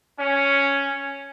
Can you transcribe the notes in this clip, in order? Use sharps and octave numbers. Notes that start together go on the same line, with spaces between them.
C#4